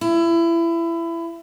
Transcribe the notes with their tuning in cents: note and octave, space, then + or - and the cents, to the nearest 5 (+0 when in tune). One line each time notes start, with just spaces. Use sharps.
E4 +25